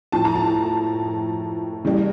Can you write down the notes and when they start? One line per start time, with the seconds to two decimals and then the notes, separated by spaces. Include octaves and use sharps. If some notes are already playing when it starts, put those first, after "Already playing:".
0.12 A2 F3 A5
0.25 A#5
0.36 A5
1.85 C#3 E3 G3